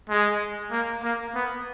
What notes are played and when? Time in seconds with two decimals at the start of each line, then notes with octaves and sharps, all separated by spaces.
0.09 G#3
0.71 A#3
1.03 A#3
1.35 B3